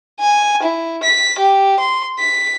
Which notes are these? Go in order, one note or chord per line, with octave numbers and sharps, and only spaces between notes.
G#5
E4
B6
G4
C6
B6